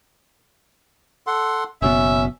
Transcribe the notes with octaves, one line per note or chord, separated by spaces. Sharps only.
A4 F#5 C6
F#1 B2 B3 C#4 E5